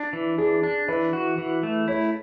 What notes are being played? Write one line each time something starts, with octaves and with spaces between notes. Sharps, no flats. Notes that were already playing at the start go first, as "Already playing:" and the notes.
Already playing: D4
E3
D4 G#4
D4
E3 B4
F#4
E3
A3
E4 C#5